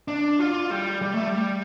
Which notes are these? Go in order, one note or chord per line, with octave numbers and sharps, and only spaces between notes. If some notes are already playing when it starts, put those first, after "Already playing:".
D4
F4
G3
G3
A3
G3